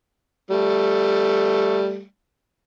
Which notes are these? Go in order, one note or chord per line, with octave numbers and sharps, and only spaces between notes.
G3 A3